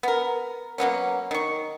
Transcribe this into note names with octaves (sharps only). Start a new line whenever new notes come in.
B3 A#4
F#3 A#3 B3 C#4
D#3 C#6